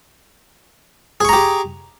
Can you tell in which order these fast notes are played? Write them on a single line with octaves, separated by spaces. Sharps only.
G#4 C#6 A#5 G4